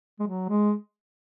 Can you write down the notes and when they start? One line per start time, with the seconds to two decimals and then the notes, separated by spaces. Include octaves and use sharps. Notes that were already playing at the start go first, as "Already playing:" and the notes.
0.20 G#3
0.27 F#3
0.49 G#3